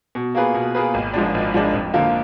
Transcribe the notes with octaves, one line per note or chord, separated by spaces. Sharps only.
B2
A#3 F4 G#4 B4
B2
A#3 F4 G#4 B4
G#1
G#2 F3 G#3 D4
G#1
G#2 F3 G#3 D4
F2
D3 F3 A#3 F4